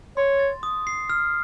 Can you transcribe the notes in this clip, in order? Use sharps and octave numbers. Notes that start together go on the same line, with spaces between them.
C#5 C6
A6
D#6
C7
F6